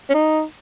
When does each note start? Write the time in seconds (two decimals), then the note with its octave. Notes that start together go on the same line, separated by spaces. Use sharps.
0.09 C#4
0.14 D#4